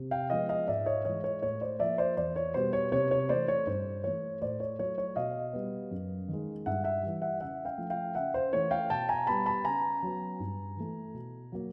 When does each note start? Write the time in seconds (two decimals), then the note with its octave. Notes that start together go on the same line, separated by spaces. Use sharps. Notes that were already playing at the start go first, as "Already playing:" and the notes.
Already playing: C3
0.11 F5 G5
0.30 F3 G#3 B3 D#5 F5
0.49 D#5 F5
0.68 G#2 D5 E5
0.86 C#5 D#5
1.05 E3 G#3 C#5 D#5
1.24 C#5
1.43 A2 C#5
1.61 C5 D5
1.79 F3 A#3 D5 E5
1.98 C5 D5
2.17 E2 C5 D5
2.36 C#5
2.54 B2 G3 B3 C5
2.73 C#5
2.92 C3 C#5
3.11 C#5
3.29 E3 A3 C5 D5
3.48 C#5
3.67 G2 C5
4.04 E3 A3 C#5
4.42 A2 C5 D5
4.60 C#5
4.79 F#3 A3 C#5
4.98 C#5
5.16 B2 D#5 F5
5.53 G3 B3
5.91 F#2
6.28 D#3 G#3
6.66 G2 E5 F#5
6.84 E5 F#5
7.03 E3 G3
7.22 E5 F#5
7.41 C#3 E5 F#5
7.65 F5 G5
7.78 F3 A3
7.90 F5 G5
8.15 C#3 E5 F#5
8.34 C5
8.53 E3 A3 C#5
8.71 F5 G5
8.90 B2 G5 A5
9.09 G#5 A#5
9.27 G3 B3 A5 B5
9.46 A5 B5
9.64 C#3 G#5 A#5
10.03 F#3 B3
10.40 G2
10.77 E3 A3
11.14 B2
11.52 F#3 A#3